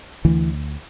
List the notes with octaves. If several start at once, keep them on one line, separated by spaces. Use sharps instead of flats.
D2 E3